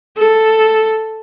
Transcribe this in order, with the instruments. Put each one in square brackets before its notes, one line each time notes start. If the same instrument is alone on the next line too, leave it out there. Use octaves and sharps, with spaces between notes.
[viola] A4